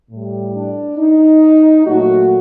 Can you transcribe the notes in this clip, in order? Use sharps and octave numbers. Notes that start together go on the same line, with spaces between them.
A2 G3
D4
D#4
A#2 F#3 A3 F#4